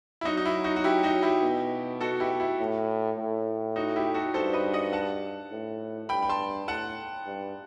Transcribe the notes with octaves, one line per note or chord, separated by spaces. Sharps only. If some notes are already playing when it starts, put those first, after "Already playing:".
E4
F#3 D#4 F#4
D#4
E4
D#4 F#4
F#4
E4 G4
D#4 F#4
E4 G4
B2
F#4 A4
E4 G4
E4
A2
A2
D#4 F#4
E4 G4
F#4 A4
G2 A4 C5
B4 D#5
D#5 F#5
F#5 A5
A2
G2 G5 B5
B5
A5 C6
A2 F#5 A5
G2